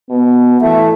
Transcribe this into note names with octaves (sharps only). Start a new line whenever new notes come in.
B2 B3
E3 A3 E5